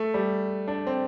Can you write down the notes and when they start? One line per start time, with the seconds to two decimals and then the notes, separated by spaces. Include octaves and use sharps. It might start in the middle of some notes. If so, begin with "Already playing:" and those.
Already playing: A3
0.14 G3
0.68 D4
0.87 C4